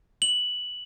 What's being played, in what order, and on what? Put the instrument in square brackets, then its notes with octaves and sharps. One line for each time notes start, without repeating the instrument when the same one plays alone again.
[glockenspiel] F#7